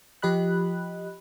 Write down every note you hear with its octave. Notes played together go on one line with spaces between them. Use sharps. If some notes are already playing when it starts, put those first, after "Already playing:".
F3 G4 D#5 B5 F#6